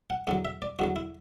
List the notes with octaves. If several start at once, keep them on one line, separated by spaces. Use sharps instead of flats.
F#5
E2 D3 F#3 F#5
E5
D5
E2 D3 F#3 F#4
E4